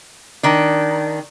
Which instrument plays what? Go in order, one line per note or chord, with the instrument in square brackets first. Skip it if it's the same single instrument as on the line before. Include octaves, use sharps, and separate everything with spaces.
[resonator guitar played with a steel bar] D#3 D4